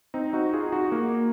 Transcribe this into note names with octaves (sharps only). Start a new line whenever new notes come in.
C4 D#4
D#4 F#4
F4 G#4
D#4 F#4
A#3